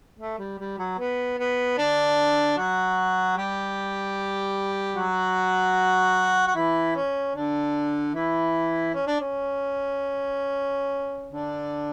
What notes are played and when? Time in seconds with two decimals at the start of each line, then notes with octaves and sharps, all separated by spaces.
0.19 A3
0.39 G3
0.59 G3
0.79 F#3
0.99 B3
1.39 B3
1.78 D3 D4
2.58 F#3 F#4
3.37 G3 G4
4.96 F#3 F#4
6.47 F#4
6.55 E3 E4
6.95 C#4
7.35 D3 D4
8.14 E3 E4
8.94 C#4
9.07 D4
9.21 C#4
11.32 D3 D4